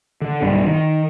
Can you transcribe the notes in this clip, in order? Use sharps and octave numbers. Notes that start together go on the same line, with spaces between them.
D3
B1 G2 G3
D#3